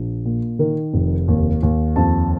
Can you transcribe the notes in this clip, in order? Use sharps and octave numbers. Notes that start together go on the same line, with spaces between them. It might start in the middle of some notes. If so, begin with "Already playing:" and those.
Already playing: A#1
A#2
D#3 A#4
F1
D#2
D#2
F2 A5